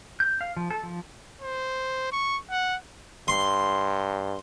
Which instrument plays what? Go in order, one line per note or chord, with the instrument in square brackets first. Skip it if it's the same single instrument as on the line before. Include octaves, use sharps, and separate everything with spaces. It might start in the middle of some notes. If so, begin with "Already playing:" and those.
[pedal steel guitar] G6
F5
F3
A4
F3
[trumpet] C5
C#6
F#5
[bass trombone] G2 [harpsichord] C6